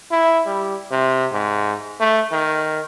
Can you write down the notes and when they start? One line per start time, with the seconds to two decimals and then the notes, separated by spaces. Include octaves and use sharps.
0.11 E4
0.46 G3
0.91 C3
1.33 G#2
2.00 A3
2.32 D#3